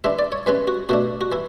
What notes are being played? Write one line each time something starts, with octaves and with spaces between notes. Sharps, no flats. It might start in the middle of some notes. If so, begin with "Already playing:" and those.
E3 G#3 D4 E5
D5
C#5
E3 G#3 C#4 B4
F#4
B2 A3 D4 F#4
F#4
E3 E4